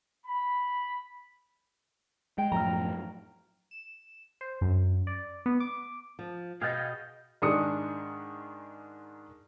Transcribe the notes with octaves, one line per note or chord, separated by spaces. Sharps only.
B5
G#3 G5
F#2 A2 F3 A#5 F6
E7
C5
F#2
D5
B3
D6
F3
B2 G#4 D#5 F5 G5 F6 A6
G#2 D#3 G#3 D4 D#6 C#7